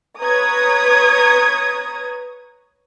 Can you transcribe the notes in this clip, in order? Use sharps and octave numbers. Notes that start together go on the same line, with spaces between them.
B4 C#5 A#5 D#6 G#6